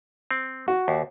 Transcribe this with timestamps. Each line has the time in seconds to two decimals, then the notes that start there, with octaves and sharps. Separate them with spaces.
0.31 C4
0.68 F#4
0.88 D#2